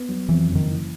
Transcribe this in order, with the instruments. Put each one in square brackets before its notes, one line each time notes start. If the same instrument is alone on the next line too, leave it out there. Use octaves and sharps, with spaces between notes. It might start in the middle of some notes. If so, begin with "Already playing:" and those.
Already playing: [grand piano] B3
F#3
[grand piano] F2 [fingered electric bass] E3
[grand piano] F#1
[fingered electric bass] D#3
[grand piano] E3